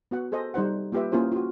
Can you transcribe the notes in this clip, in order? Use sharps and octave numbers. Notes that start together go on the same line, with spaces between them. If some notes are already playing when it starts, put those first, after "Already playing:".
B3 F#4 F#5
G#4 A4 C5 D#5
G3 D#4 C5 F#5
A#3 F4 G4 B4 E5
A#3 C#4 E4 F4 G#4 C5
F4 F#4